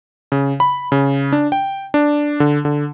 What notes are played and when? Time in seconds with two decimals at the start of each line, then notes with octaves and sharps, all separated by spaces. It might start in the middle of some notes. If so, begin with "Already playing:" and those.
0.32 C#3
0.60 B5
0.92 C#3
1.32 D4
1.52 G5
1.94 D4
2.40 D3
2.65 D3